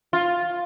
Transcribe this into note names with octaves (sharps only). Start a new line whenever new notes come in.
F4